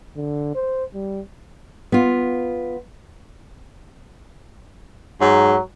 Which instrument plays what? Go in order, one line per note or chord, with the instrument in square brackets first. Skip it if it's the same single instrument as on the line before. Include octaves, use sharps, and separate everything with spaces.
[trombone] D3
C5
G3
[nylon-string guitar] B3 F4
[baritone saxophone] G#2 [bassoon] F#3